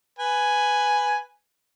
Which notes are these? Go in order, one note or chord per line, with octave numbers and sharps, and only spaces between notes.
B4 G#5